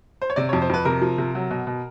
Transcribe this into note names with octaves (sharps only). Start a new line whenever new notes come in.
C5
C#5
C3 D5
C#5
F2
C5
F2 B4
C3 A#4
F3
C3
F#3
B2
B2